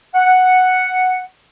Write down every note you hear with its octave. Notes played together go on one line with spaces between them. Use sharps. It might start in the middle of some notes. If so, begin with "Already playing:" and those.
F#5